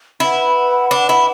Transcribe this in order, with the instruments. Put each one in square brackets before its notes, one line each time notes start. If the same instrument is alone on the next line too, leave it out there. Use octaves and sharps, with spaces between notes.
[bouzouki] E4 [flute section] B4 F#5 B5
[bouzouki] D4
E4